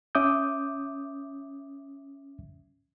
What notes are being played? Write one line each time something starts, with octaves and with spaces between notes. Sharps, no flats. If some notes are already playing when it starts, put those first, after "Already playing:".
C#4 E5 D6 D#6 G6